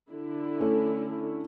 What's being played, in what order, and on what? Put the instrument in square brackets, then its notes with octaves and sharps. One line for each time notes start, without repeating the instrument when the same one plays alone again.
[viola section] D3 E4
[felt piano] A3 C#4